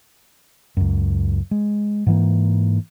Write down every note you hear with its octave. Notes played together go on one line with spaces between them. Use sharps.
C#2 F#2
G#3
G#2 E3 A#3